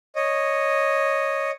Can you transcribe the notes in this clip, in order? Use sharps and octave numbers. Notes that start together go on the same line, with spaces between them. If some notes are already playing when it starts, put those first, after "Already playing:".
C#5 D#5